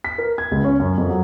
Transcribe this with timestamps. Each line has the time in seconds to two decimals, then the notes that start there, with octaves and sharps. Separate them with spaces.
0.04 B6
0.18 A#4
0.38 G#6
0.51 C#2
0.64 C#4
0.80 F#2
0.98 F2
1.09 F#3